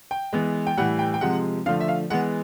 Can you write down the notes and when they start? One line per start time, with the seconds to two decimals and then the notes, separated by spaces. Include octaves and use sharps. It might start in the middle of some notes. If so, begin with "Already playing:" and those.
0.11 G5
0.33 E3 G#3 B3
0.67 G5
0.77 A2 E3 G3 F#5
0.99 G5
1.14 G5
1.21 C3 F3 G#3 F#5
1.66 D3 F3 A3 F5
1.80 E5
1.88 F5
2.10 E3 G#3 B3 F#5